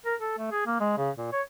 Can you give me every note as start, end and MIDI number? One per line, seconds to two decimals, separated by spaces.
0.05 0.15 70
0.20 0.34 69
0.38 0.51 57
0.51 0.62 68
0.66 0.76 58
0.80 0.96 56
0.97 1.10 49
1.17 1.30 46
1.32 1.42 73